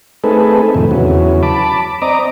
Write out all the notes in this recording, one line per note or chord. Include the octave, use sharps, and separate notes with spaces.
A3 C4 D#4 G#4 A4 B4
F2 A2 C3 D#3
E2 C#3 F#3
A5 B5 D6
C4 D5 D#5 A#5 D6